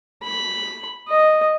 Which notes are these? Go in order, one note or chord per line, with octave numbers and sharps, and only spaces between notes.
B5
D#5